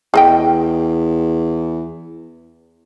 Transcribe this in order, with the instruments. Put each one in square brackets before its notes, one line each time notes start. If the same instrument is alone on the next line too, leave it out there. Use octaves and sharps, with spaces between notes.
[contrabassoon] E2 [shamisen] G#4 D#5 G5